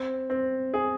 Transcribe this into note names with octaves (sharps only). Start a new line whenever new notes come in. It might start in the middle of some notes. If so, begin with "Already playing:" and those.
Already playing: C4
C4
G#4